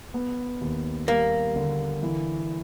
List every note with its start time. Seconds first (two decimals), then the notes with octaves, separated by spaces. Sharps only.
0.14 B3
0.61 D#2
1.08 G3 A#3
1.56 D3
2.03 E3